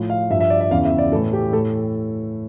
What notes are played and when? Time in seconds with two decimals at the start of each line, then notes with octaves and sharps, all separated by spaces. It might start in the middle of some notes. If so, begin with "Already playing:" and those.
Already playing: A2 F3
0.10 F5
0.30 G2 F3 E5
0.41 E5
0.50 D5
0.61 E5
0.71 E2 C#3 E3 F5
0.85 E5
0.98 D5
1.12 E3 A4
1.15 A2
1.33 G4
1.52 A2 A4